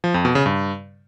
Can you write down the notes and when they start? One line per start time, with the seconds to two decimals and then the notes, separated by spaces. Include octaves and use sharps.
0.04 F3
0.14 F2
0.25 B2
0.35 C#3
0.46 G2